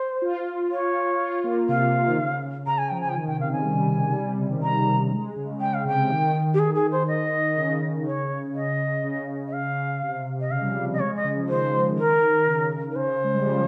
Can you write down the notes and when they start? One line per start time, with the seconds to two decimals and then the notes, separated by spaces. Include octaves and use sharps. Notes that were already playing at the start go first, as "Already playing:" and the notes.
Already playing: C5
0.22 F4
0.71 C#5
1.20 F4
1.44 A#3
1.69 C3 F5
2.08 D#3
2.18 C#3
2.67 C#3 A#5
2.78 G#5
2.89 F3 G5
3.01 G#5
3.09 G5
3.16 D#3 G#5
3.28 C3 G5
3.40 C#3 F5
3.53 D#3 G#5
3.65 G3
4.09 G#3
4.14 G3
4.26 C3
4.38 C#3
4.50 D#3
4.62 G3 A#5
5.12 G#3
5.36 C#3
5.60 C#3 G5
5.73 C#3 F5
5.85 C3 G5
5.98 C#3
6.10 D#3
6.54 G4
6.59 G#4
6.75 G#4
6.92 C5
7.07 D#5
7.56 C#3
8.06 C#5
8.55 D#5
9.04 C#3
9.47 D#5
9.53 F5
10.02 C3
10.40 D#5
10.51 C#3 F5
10.61 G3
10.67 F3
10.84 G3
10.93 D#5
11.00 G#3 C#5
11.16 D#5
11.24 C#3
11.36 F3
11.49 D#3 C5
11.98 A#4
12.47 C#3
12.91 A#4
12.96 C#3 C5
13.24 G#3
13.34 G3
13.45 F3